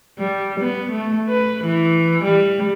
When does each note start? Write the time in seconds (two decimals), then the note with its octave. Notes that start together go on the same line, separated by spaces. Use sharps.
0.19 G3
0.60 B3
0.91 A3
1.29 B4
1.64 E3
2.24 G3